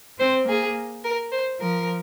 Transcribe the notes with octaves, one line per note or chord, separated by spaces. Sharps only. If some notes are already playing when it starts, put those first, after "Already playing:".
C4 C5
A#3 G#4
A#4
C5
F3 A#4